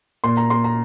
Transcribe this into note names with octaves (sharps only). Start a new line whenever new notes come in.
A#2 C6
A#5
A#3 C6
A#5